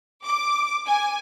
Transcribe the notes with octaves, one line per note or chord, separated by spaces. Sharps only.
D6
G#5